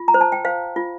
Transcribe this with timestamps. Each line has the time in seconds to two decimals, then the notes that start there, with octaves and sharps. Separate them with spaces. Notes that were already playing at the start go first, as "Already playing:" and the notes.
Already playing: F4
0.08 A#5
0.14 C5
0.21 A5
0.32 G5
0.45 C5 F5
0.76 F4